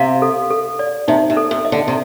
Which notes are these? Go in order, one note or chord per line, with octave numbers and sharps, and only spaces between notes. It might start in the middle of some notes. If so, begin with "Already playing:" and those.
Already playing: C3 F5
A4
A4
D5
C3 D#4
C3
A4
C3
D#5
D3
C3